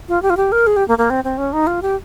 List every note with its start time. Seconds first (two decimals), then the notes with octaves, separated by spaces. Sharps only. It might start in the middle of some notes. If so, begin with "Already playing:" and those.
0.08 F4
0.22 G4
0.30 F4
0.37 G4
0.52 A#4
0.67 G#4
0.76 G4
0.88 A#3
0.98 A#3
1.10 C4
1.24 C4
1.38 C#4
1.53 D#4
1.67 F4
1.82 G4